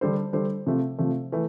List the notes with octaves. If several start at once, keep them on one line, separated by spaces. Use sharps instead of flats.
D3 G3 D4 A4 C5
D3 G3 D4 A4 C5
C3 F3 A3
C3 F3 A3
E3 A3